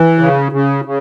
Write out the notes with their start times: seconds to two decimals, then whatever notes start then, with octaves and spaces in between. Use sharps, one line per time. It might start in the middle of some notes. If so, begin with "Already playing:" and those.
Already playing: E3
0.19 C#3
0.52 C#3
0.85 C#3